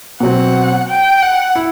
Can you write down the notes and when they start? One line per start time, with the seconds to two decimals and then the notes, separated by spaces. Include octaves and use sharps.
0.20 B2 F#3 C4 F#5
0.88 G5
1.22 F#5
1.55 E4